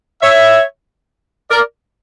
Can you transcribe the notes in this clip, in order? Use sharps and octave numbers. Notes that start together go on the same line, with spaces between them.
C#5 E5
A#4 D5